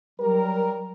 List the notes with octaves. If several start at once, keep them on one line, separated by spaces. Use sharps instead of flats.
F#3 G3 A#4